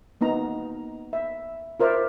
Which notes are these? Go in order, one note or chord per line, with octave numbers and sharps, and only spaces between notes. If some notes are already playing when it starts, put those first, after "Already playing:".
A#3 B3 D#4 A#5
E5
F4 A#4 C5 D5 E5